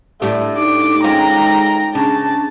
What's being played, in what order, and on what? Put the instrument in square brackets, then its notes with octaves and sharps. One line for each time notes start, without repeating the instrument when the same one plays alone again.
[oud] A2 D4 G4 [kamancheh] A3
[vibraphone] D#4 A4 [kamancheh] D6
[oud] G#3 C#4 F4 [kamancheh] G5 A#5
[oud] C#3 [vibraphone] C#4 D4 [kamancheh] A5